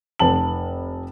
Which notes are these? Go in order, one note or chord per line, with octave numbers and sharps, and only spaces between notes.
F1 A5 F#7